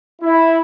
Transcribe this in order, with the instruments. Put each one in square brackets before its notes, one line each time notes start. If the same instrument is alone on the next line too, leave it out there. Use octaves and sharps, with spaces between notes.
[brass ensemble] E4